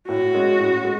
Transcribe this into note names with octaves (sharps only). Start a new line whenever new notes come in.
A2 F#4
G#3 C#4
A2
G#3